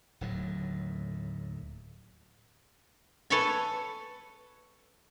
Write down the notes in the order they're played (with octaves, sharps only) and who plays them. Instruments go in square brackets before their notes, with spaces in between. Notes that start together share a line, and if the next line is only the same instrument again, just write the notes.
[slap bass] D1 D#2 A2 F#3
[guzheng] A4 B4 C#5 E5 G#5 B5